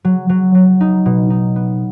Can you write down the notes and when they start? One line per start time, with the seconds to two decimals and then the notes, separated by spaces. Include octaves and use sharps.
0.05 F#3
0.29 F#3
0.55 F#3
0.81 D#4
1.06 B2
1.30 D#4
1.56 B3